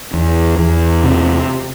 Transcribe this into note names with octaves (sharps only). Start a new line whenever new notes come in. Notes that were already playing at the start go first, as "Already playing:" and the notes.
E2
E2
C3